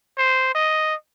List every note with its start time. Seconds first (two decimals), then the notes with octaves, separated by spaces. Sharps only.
0.18 C5
0.55 D#5